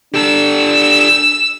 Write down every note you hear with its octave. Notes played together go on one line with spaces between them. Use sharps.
D4 G4 A4 E6